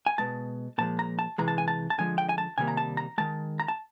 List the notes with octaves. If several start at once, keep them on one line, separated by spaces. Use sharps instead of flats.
G#5
B2 G#3 A5
A#2 F3 G#3 A5
A#5
A5
C3 E3 G#3 A#5
A5
G#5
A5
A5
D3 F3 G#3 G#5
G5
G#5
A5
C3 D#3 G3 A#3 G#5
A#5
A5
A#5
D#3 G#3 A5
A#5
A5